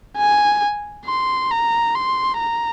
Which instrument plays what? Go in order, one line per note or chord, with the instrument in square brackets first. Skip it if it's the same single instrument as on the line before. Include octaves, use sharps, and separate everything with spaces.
[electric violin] G#5
C6
A#5
C6
A#5